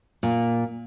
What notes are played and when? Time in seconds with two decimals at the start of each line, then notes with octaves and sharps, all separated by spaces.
0.23 A#2